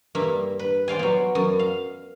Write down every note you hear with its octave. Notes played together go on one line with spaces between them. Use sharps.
G2 A#3 E5
B4
C5 D5 F5 G#5
F#3 B3
F#2
F5